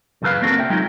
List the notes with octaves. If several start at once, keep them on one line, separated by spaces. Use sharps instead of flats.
F#2 C#3 E3 A4 B4 F5
A#3 C4 D4 F#4 A4 A#4
E5 G5
F#3 G#3 D#4 F4 G5